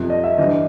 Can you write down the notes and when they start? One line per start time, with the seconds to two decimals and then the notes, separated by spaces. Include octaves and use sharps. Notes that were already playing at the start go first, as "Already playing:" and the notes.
Already playing: F2 C3 F3
0.10 D#5
0.24 E5
0.38 G2 E3 D#5